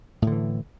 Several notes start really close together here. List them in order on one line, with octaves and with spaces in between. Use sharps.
A2 D3 E3